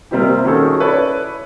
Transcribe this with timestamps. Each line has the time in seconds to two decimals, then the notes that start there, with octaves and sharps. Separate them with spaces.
0.11 C3 G3 A#3 C4 E4 G4
0.44 D#3 C#4 F#4 G#4 A4
0.78 E4 A4 B4 C#5 D5